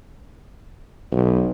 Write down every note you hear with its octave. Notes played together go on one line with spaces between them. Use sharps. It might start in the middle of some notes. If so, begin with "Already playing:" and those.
B1